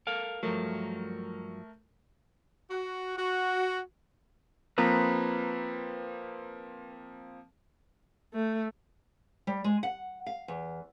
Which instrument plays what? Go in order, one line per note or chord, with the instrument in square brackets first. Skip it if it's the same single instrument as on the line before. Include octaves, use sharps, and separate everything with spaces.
[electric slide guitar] A4 A#4 F5
[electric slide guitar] G2 F3 F#3 [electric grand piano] A3 A#4
[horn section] F#4
F#4
[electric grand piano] F3 A#3 C4 [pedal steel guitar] B4 A#5 D#6
[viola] A3
[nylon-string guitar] G3
G#3
F#5
F5
E2